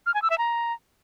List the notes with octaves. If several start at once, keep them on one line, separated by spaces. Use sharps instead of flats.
F6
G#5
E6
E5
A#5